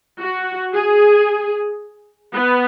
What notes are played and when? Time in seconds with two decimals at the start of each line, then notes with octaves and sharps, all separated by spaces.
0.20 F#4
0.73 G#4
2.33 B3